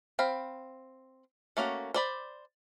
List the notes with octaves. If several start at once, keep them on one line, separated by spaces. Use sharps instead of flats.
C4 F5 G5 B5
A3 A#3 C#4 F#4
C5 D5 B5